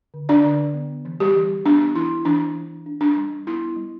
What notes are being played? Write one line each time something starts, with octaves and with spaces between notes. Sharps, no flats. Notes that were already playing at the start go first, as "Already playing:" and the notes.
D3
D4 D5
D3
B3
E3
G3 G4
E3
B3 D4
E3 E4
E3 D4
D4
D4
D4
G3
B3 E4
G3